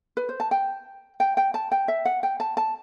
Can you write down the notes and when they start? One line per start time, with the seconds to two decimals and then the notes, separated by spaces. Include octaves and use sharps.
0.17 B4
0.29 C5
0.40 A5
0.51 G5
1.20 G5
1.37 G5
1.54 A5
1.72 G5
1.88 E5
2.05 F#5
2.23 G5
2.40 A5
2.57 A5